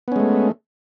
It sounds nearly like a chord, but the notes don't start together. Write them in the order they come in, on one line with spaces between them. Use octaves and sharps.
B3 C#4 G#3 A3